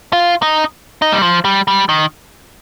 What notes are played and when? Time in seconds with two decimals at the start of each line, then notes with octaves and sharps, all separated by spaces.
0.13 F4
0.42 D#4
1.02 D#4
1.12 G3
1.23 F3
1.45 G3
1.68 G3
1.89 D#3